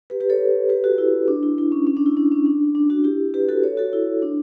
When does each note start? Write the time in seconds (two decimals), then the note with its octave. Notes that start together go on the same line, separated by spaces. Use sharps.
0.10 G4 B4
0.20 G4 B4
0.30 A4 C#5
0.69 G4 B4
0.84 F#4 A4
0.98 E4
1.28 D4
1.43 E4
1.58 E4
1.72 C#4
1.87 C#4
1.97 D4
2.06 E4
2.17 D4
2.32 C#4
2.46 D4
2.75 D4
2.90 D4 F#4
3.04 E4 G4
3.34 G4 B4
3.49 F#4 A4
3.64 A4 C#5
3.77 F#4 A4
3.93 E4
4.22 D4